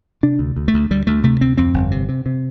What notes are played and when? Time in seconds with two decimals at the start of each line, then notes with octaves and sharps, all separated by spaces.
0.23 C3 D4
0.39 D2
0.56 D2
0.68 A3
0.74 D2
0.91 D2 G3
1.07 D2 A3
1.23 C3 A3
1.41 D2 C4
1.57 F2 C4
1.74 G1
1.91 C3
2.09 C3
2.26 C3